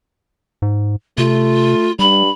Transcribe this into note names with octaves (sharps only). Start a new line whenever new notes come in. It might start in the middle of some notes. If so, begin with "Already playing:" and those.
G#2
C3 A3 F4
G2 G3 B5